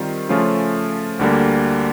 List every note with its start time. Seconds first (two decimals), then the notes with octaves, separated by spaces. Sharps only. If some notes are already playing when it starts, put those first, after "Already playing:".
Already playing: D#3 G3 C4 F4
0.29 C#3 F3 A3 C#4 F4
1.19 D2 D3 G3 A#3